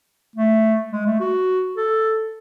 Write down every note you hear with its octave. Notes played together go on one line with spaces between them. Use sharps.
A3
G#3
A3
F#4
A4